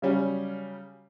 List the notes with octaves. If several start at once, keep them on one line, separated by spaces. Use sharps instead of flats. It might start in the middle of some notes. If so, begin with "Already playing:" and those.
C#3 F#3 G3 C#4